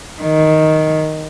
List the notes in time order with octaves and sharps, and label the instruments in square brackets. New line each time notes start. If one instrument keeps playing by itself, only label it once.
[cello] D#3